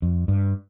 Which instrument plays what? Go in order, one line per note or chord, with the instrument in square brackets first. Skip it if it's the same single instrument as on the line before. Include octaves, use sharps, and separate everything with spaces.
[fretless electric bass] F2
G2